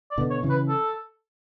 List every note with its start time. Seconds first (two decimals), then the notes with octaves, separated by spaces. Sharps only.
0.11 D5
0.18 B2 D3
0.30 C#5
0.43 C#3 E3
0.50 B4
0.68 A4